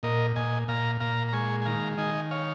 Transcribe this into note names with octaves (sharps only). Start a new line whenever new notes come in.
A#2 A#4 D#5
A#2 D#5 G#5
A#2 F5 A#5
A#2 F5 A#5
A#5
G#3 G#5 C#6
G#5
D#3 F5 A#5
D#3 D#5 G#5
C#5 F5